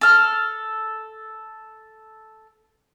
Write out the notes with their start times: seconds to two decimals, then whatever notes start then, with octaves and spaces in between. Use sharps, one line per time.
0.01 A4 F6